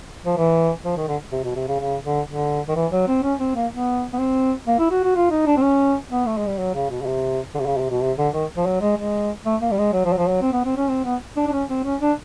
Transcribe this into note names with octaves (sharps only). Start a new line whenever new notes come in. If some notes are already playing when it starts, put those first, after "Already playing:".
F3
E3
F3
D#3
D3
C3
B2
C3
C#3
C#3
D3
D3
D#3
E3
F#3
C4
C#4
C4
A#3
B3
B3
C4
A#3
E4
F#4
F#4
F4
D#4
D4
C4
C#4
B3
A3
G#3
G3
F#3
C#3
B2
C#3
C3
D3
C3
C#3
C3
B2
C3
D3
D#3
F3
F#3
G#3
G#3
A3
A#3
G3
G#3
F#3
F3
F#3
F3
F#3
C4
B3
C4
C#4
C4
B3
D4
D4
C#4
C4
C#4
D4